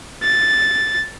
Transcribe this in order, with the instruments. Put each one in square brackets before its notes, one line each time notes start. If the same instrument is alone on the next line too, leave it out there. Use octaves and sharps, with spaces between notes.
[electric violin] A6